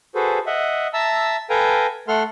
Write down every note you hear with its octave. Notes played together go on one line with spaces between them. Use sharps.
F#4 G#4 A4 B4 C5
D#5 E5 F#5
E5 A5 A#5 E6
A4 B4 F5 G5 G#5 A#5
A3 A4 F#5 C6 F6